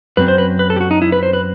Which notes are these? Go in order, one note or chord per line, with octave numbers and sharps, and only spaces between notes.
F#2 F#3 C4 B4
C5
B4
B4
A4
G4
F#4
D#4
E4
B4
C5
B4